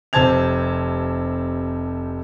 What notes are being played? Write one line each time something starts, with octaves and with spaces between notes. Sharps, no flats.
F1 C3 C5 A5 G#6 F7